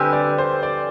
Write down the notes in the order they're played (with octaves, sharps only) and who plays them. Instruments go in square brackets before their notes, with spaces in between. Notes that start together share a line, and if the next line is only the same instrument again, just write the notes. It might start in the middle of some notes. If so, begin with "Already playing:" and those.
Already playing: [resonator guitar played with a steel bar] D3 G3 C4 G4 B4 [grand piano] G#5
[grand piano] D5
C5
D5